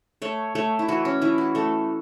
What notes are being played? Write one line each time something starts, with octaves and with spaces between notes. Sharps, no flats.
A3 C#5
A3 C#5
E4
E3 F#4
C#4
E3 E4
F#4
A3 A4